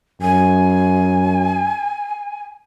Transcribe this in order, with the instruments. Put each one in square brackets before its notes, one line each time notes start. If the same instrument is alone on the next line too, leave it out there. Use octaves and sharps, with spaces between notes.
[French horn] F#2 [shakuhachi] G#5